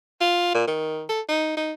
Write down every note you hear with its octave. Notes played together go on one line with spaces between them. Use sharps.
F4
A#2
D#3
A4
D#4
D#4